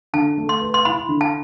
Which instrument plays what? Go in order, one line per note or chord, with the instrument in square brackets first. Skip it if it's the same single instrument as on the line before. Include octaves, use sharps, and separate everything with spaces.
[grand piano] D3 [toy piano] A5
[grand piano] A3
[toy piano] C6
[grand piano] B4
[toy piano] C6
[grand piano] E4 [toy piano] B5
[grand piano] D3
[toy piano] A5